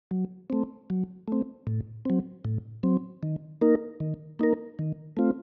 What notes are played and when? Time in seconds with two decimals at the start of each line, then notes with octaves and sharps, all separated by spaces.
0.11 F#3
0.50 A3 C4
0.90 F#3
1.28 A3 C4
1.67 A2
2.05 F#3 C4
2.45 A2
2.83 F#3 C4
3.23 D#3
3.61 A#3 D#4 A#4
4.00 D#3
4.39 A#3 D#4 A#4
4.79 D#3
5.17 A3 C4 F4